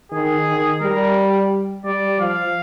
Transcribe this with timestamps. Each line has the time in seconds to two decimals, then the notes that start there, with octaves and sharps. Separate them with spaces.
0.12 D#3 G#4
0.47 D#3
0.81 G3 A#4
1.85 G3 D5
2.19 F3 F5